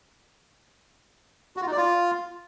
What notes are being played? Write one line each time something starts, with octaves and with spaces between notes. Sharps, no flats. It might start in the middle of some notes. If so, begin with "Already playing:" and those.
F#4
F4
D#4
D5
F4